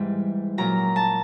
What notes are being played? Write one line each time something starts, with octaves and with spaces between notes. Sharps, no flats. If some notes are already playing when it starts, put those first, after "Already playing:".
Already playing: G#2 E3 G3
A#2 F#3 A#5
A5